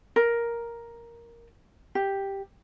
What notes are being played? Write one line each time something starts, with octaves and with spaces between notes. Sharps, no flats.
A#4
G4